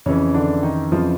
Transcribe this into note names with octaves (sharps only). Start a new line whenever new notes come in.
F2 C#3 E3 C#4
D3 D4
D#3 D#4
F2 C#3 E3 F3 F4